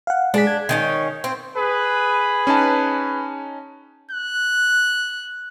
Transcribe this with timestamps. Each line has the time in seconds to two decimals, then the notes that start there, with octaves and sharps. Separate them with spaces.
0.07 F5 F#5
0.34 G#3 D4 G#4 B6
0.47 G#6
0.69 D#3 C4 C#4
1.24 C4
1.56 G#4 B4
2.47 C#4 D#4 A5
4.11 F#6